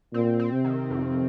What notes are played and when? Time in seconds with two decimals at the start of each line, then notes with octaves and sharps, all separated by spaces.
0.13 A#2 C4
0.40 C4
0.52 C3
0.65 D#3
0.90 F2